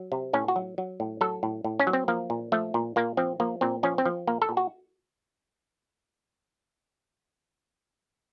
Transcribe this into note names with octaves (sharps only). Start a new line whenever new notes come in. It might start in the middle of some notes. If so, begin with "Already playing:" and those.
Already playing: F#3
C3
A2 C#4
F#4
F#3
F#3
A2
F#3 A4
A2
A2
C#4
F#3
C4
F3 A#3
A#2
F3 A3
A#2
A#2 A#3
F3 C4
F3 A#3
A#2 C4
F3 C#4
C4
F3
A#2 A#3
A4
A#2
F#4